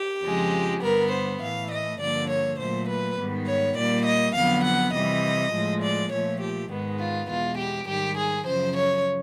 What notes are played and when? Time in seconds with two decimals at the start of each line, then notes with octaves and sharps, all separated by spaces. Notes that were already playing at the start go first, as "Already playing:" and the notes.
Already playing: G4
0.23 F2 C#3 F3 G#3
0.82 G2 D3 G3 B3 A#4
1.11 C5
1.41 A2 E3 A3 F5
1.70 D#5
2.00 G2 D3 F3 A#3 D5
2.29 C#5
2.59 A#2 F#3 A3 C5
2.88 B4
3.17 G#2 D#3 G3 B3
3.46 C#5
3.76 A#2 G3 A#3 D5
4.05 D#5
4.35 F2 D3 F#3 B3 F5
4.63 F#5
4.93 C3 E3 G3 D#5
5.52 A2 F3 G#3
5.81 D5
6.11 A#2 F3 A3 C#5
6.40 G4
6.70 G#2 D#3 G#3 B3
6.99 F4
7.29 E2 B2 G#3 F4
7.57 G4
7.87 G#2 D#3 G3 G4
8.17 G#4
8.46 F#2 C#3 F3 C5
8.75 C#5